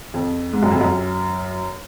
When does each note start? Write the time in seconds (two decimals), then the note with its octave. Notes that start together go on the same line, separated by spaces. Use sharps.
0.14 F2
0.53 G#2
0.63 F#2
0.71 F2
0.81 F#2